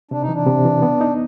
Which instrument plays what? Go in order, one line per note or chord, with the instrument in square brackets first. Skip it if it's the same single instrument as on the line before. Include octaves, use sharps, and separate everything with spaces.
[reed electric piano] C3 [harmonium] D4
[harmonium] D#4
[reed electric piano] E3 [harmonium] D4
[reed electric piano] C3
E3
B3
D#4